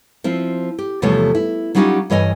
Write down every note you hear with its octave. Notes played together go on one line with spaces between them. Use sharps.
F3 C4 E4
G4
E2 C3 F3 G3 A3 C#5
E4
F#3 G3 C#4 D#4 F4 G4
G2 E3 C#5 D#5 G#5